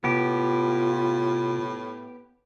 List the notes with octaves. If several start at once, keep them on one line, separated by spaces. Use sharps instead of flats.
A2 C3 B3 F4 G4